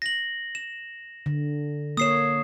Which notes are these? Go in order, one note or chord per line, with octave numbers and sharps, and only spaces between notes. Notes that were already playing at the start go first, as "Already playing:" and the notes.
A#6 F#7
E7
D3
A#3 C#5 D#6 C7 E7